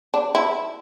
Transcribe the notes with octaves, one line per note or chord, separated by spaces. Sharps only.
D4
E4